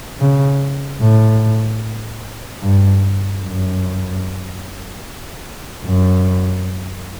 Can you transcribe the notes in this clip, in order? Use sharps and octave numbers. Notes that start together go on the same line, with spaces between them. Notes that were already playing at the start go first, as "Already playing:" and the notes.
C#3
A2
G2
F#2
F#2